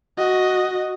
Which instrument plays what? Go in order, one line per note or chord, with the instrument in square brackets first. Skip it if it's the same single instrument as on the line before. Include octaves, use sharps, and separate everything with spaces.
[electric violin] F#4 D#5